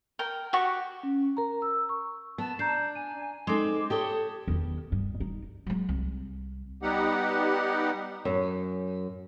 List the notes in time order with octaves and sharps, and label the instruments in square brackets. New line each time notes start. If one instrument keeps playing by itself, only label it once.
[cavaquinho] A#4 G5
F#4 G4 C#6
[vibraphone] C#4
A#4 A#5
E6
C#6
[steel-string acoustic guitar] B3 [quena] A5
[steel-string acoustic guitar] D4 [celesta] A#5 G6 C7
[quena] G#5 [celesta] D#7
[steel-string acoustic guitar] G#3 C4 [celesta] D#4 A4 C6 [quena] D6
[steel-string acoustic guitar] G4 A4 C#5 [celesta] G5 [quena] D#6
[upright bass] E2 D#3
G2
D#4
F#3 G#3
C2
[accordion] G3 B3 D#4 G4 F#5
[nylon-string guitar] F#2